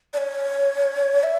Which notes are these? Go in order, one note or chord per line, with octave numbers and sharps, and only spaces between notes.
D5
C#5
E5